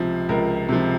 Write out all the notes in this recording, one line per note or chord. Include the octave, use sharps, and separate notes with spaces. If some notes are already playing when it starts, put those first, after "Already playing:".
Already playing: C#2 C3 F3
C#2 A#4
C3 F3